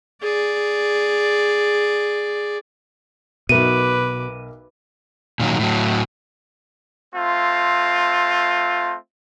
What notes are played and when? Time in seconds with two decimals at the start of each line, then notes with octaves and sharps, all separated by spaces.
0.22 G#4 D5
3.49 B1 B2 A#4 B4 E5 D6 D#7
5.40 A#2 D#3 F#3
5.59 A2 F#3
7.14 A3 C4 F4